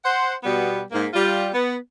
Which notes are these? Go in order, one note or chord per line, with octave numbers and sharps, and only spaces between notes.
C5 F#5
B2 G3 B3
G#2 A#3
G3 F4
B3